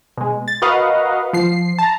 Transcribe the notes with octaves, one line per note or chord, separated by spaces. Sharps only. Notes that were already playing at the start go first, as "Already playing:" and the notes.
B2 G#3
A6
F#4 A#4 B4 D#5 F5 F#5
F3 C7
A5 A#5